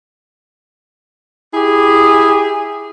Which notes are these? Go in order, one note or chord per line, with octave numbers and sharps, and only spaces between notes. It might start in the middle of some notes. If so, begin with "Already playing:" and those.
E4 G4 G#4